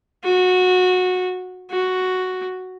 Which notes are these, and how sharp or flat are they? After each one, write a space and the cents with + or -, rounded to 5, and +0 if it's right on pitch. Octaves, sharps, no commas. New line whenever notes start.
F#4 -15
F#4 +0